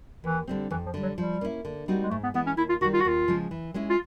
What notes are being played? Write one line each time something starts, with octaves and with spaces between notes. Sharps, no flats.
D#2 E3
D3 G3 C4
F2 E3
F3
D3 G3
F#3
F3 G3
A#3 C#4 E4
D3
G3 C4 D#4 F#4
G#3
G#2 A3
B3
E3 G#3 B3
C#4
D#2 E4
F4
D#3 G3 F#4
F4
F#4
D#2 F4
C#3 F3 G#3
E3
G#3 C#4 E4 G#4
F4